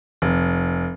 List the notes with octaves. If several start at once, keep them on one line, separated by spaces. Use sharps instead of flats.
F1